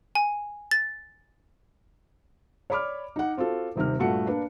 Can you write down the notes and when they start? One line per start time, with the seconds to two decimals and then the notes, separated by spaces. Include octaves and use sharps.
0.15 G#5
0.71 A6
2.70 C#5 D5 B5 D6 F6
3.16 D#4 F#5
3.37 C4 F4 F#4 A4
3.76 D#1 C3 D#3 F6
3.99 G2 A#2 A3 F#4 F#5 C#7
4.27 A#3 D4 B4